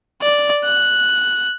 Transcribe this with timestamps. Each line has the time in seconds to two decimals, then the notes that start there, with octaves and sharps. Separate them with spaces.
0.22 D5
0.65 F#6